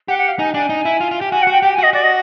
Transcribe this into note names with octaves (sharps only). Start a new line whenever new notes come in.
G4 F#5
F#5
F5
D#4 G#5
D4 G#5
D#4
E4
F4
F4
G4
F#4 G#5
F#5
F#4 G5
G4 G5
G#5
F#4 D#5
F#4 D5
D#5